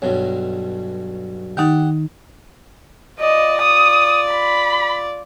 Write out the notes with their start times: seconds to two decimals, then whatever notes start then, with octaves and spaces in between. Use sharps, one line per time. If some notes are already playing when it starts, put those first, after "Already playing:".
0.02 B1 G2 B2 C#5
1.57 D#3 D#4 G4 F#5 A5
3.20 F4 D5 D#5
3.62 D#6
4.31 B5